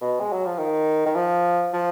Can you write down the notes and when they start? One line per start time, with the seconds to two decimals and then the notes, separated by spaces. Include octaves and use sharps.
0.01 B2
0.20 G#3
0.32 F#3
0.46 F3
0.58 D#3
1.06 D#3
1.15 F3
1.73 F3